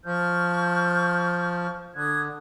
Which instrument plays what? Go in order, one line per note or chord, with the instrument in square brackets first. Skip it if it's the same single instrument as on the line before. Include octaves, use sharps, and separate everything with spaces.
[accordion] F3 [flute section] C#6 F6 G6
[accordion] D3 [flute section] D#6 F#6 G#6